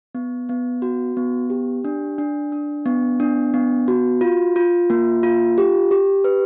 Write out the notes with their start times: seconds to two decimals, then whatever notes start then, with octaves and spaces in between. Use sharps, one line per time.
0.15 B3
0.49 B3
0.82 F#4
1.17 B3
1.50 G4
1.85 D4
2.18 D4
2.52 D4
2.86 B3
3.20 D4
3.54 B3
3.88 F#4
4.21 F4
4.56 F4
4.90 A#3
5.23 F4
5.58 G4
5.91 G4
6.24 B4